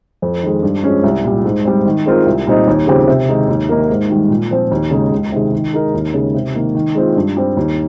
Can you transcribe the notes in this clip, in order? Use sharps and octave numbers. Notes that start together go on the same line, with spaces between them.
F2
D#3 G#3
G2
F3 G#3 C#4
C2
A#2 G3
G#2
G3 C4
D#3
G#3 C4 F4 A#4
C2
A#2 G3 C4 D#4
D#2
C#3 F3 C4 G4
C3
D#3 G#3 D#4
D#2
D#3 A#3 D#4 A#4
G#2
D#3 G3
A#2
F3 C4
D#2
C#3 G#3 D#4 G#4
C#2
C3 D#3 G#3
D#3
G#3 D#4 A#4
D#2
C#3 G#3
C3
D#3 A#3
D#3
G#3 C4 F4
G2
G3 C4
D#2